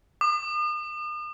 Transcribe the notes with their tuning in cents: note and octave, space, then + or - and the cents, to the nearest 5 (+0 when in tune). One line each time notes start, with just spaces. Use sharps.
D#6 -45